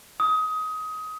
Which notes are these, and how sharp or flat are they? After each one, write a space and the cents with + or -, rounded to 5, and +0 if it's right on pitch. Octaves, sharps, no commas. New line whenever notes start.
D#6 +20